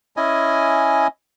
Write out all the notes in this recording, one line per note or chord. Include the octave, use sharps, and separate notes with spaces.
C#4 E4 D#5 G#5